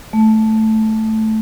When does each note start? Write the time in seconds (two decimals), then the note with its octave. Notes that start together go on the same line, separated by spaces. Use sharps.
0.13 A3